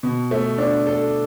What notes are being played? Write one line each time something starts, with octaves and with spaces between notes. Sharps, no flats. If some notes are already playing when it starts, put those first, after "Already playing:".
B2
A3
D4
A4